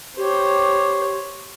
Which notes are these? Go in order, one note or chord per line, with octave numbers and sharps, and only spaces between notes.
G4 C5 C#5